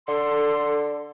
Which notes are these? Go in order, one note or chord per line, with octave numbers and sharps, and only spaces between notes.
D3 A4 C6